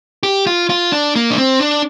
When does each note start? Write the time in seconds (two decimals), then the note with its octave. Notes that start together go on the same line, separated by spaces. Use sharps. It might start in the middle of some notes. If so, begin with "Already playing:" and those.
0.23 G4
0.47 F4
0.70 F4
0.92 D4
1.16 A#3
1.31 D4
1.38 C4
1.61 D4